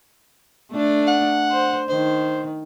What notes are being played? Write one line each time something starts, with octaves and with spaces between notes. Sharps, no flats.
A3 D4
F#5
C5
D#3 C5